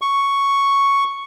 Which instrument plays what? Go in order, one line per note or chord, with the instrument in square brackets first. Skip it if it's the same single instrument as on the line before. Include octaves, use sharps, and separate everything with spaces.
[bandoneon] C#6